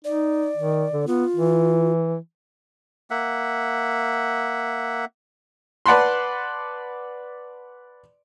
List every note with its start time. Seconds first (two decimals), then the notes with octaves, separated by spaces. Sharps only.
0.05 D#4 D5
0.57 D#3
0.93 D3
1.07 B3 F4
1.36 E3
3.11 A#3 E5 F#5
5.86 B4 D5 F#5 A5 B5 C6